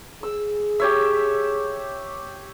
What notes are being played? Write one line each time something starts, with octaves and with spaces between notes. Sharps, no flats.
G#4 E6
G4 C#5 E5